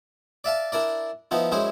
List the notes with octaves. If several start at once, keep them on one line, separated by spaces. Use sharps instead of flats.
D5 E5 F5 A5
D4 E4 A#4 D5
F3 B3 D#4 E4
F#2 G#3 E4 G#4 C5